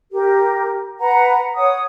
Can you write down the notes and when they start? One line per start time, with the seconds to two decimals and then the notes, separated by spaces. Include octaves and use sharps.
0.12 G4 A#4
1.00 B4 F#5 A#5
1.56 C#5 F#5 D#6